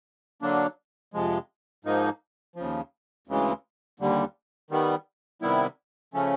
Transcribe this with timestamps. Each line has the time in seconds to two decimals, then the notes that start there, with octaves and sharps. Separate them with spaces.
0.42 D3 F#3 A#3 D4
1.14 F2 C3 F3 G#3
1.85 G#2 F3 A#3 D#4
2.56 D#2 C#3 F3
3.27 D2 C#3 E3 G#3
4.00 D#2 D3 G3
4.71 D#3 G3 B3
5.42 C3 D#3 G3 B3 E4
6.14 C#3 F3 A3 C#4